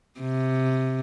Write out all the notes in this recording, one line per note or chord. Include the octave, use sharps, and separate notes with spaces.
C3